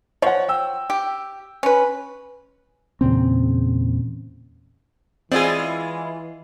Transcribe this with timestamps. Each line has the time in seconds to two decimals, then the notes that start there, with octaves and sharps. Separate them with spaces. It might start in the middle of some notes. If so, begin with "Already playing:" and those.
0.22 F3 C#5 F#5
0.48 G5 E6
0.90 G4
1.63 C#4 B4
3.01 E2 A#2 C#3 C4
5.32 E3 G#3 C4 E4 F4 G#4 D5 D#5